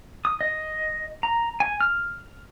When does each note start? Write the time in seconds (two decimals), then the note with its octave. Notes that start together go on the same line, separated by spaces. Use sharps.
0.25 D#6
0.41 D#5
1.23 A#5
1.60 G#5
1.81 F6